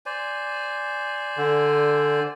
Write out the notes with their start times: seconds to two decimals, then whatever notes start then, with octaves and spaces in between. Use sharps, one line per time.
0.06 C5 D5 G#5
1.38 D3